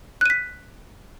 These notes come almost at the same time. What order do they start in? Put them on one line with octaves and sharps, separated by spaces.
F#6 D#7 B6